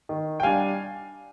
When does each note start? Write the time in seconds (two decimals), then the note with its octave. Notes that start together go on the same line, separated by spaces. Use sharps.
0.09 D#3
0.40 G5
0.43 G3 D4 F5 G#5